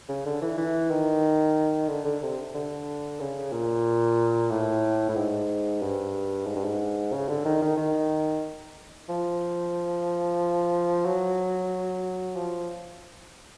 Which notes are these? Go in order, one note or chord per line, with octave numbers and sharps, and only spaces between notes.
C#3
D3
E3
E3
D#3
D3
D3
C3
D3
C#3
A#2
A2
A2
G#2
G2
G#2
G2
G#2
C#3
D3
D#3
D#3
D#3
F3
F#3
F3